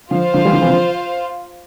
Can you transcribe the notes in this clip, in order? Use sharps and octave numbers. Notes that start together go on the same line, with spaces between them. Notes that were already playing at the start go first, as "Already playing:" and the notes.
D3 F3 F4 C5 F5
D3 F3
E3 G3
D3 F3
C3 E3
D3 F3